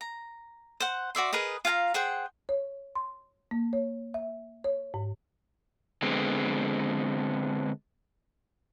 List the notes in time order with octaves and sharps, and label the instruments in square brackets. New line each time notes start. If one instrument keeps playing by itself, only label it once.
[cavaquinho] A#5
C5 F#5
F#4 D5 E5 C6
G#4 A#4 B4 D#5
F4 F5 G#5 A#5
G#4 C5 F#5 G5
[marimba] C#5
C6
A#3
C#5
E5
C#5
G#2
[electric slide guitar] D3 G#3 B3 C4